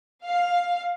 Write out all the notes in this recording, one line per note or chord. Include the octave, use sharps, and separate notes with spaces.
F5